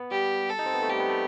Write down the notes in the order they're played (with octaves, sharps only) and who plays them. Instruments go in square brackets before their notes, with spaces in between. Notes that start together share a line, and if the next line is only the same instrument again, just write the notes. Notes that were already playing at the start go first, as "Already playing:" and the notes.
Already playing: [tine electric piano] B3
[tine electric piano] G3 [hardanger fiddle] G4
[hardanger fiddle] A4
[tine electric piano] D#4
C4
B3
A3
[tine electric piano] G3 [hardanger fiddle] G4
[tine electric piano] B3
A3